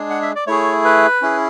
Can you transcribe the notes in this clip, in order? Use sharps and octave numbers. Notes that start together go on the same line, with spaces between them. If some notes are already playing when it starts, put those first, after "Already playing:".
Already playing: G#3 D4 G#4
F#5
E5
D5
A3 E4 G#4 C#5
B4
C#4 E4 G#4